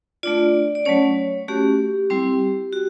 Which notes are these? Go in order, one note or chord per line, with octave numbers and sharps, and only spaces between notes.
A3 D4 F4 D5
D5
F#3 A3 C#4 C#5
A3 C#4 F#4 G4
G3 C4 E4
F#4